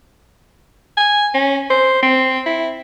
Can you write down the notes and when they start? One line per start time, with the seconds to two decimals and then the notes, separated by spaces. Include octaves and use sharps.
0.97 G#5
1.34 C#4
1.70 C5
2.02 C4
2.46 E4